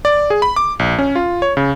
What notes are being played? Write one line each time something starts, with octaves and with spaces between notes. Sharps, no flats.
D5
G#4
B5
D6
A#1
C#4
F4
C#5
C#3